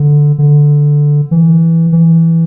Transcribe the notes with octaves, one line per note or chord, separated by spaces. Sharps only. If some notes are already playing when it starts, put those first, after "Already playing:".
Already playing: D3
D3
E3
E3